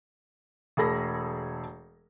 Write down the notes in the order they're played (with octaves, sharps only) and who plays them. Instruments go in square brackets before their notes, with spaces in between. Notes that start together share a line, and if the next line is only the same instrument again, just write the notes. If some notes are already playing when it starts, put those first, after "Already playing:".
[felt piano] E1 A3 G#4 A4 B5 A#6